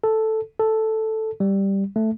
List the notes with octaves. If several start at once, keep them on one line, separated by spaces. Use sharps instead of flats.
A4
A4
G3
A3